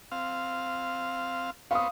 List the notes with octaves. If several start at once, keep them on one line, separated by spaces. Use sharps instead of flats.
C4 F5
B3 C4 C#5 F5 D#6